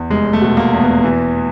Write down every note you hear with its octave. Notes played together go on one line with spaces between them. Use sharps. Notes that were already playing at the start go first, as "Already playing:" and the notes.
Already playing: E2
F1 G#3
A3
B2
A#3
E2
B3
E3